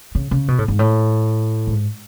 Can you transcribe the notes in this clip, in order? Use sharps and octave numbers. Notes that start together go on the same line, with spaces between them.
C#3
C#3
B2
A2
G#2
A2
G#2